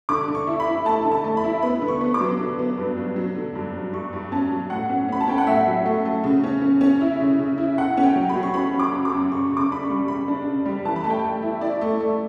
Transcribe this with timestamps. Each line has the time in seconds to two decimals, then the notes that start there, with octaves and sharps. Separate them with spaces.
0.09 D3 D6
0.28 D3
0.35 C#6
0.47 E4
0.60 B5
0.67 E4
0.85 A3 A5
1.05 D3
1.12 A5
1.24 A3
1.37 B5
1.44 E4
1.62 B3 B5
1.82 D3
1.88 C#6
2.01 B3
2.14 D6
2.20 F#3
2.40 D3
2.59 B3
2.77 G2
2.97 F#3
3.16 F#3
3.36 D3
3.55 G2
3.73 F#3
3.93 G2 C#6
4.13 G2
4.32 C#4 A5
4.51 F#3
4.70 A2 F#5
4.89 C#4
5.08 C#4 B5
5.21 A5
5.28 C#4 G5
5.38 F#5
5.46 A2 E5
5.67 F#3
5.85 A3
6.05 A3
6.24 C#3
6.44 C#4
6.62 C#4
6.81 C#4
7.01 E4
7.20 C#3
7.39 C#3
7.58 E4
7.78 C#3 F#5
7.97 C#4
8.03 G5
8.16 F#3
8.29 B5
8.36 F#3
8.43 C#6
8.54 C#4 B5
8.74 C#4
8.79 D6
8.92 F#2
9.05 D6
9.12 F#2
9.31 C#3 C#6
9.50 C#3
9.57 D6
9.70 D4 B5
9.83 C#6
9.90 G3
10.08 C#3 B5
10.28 D4
10.46 C#3
10.65 G3
10.85 E3 A5
10.96 B5
11.04 A3 A5
11.10 G5
11.24 A3
11.42 E4
11.61 E4 D5
11.81 A3
12.00 A3